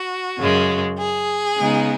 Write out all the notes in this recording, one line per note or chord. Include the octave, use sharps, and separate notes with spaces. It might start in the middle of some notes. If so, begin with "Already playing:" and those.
Already playing: F#4
F#2 C#3 G#3
G#4
C#3 G#3 B3 D#4